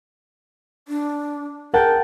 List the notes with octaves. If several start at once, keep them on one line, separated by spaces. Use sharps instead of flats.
D4
G#4 A#4 F#5 G5 A5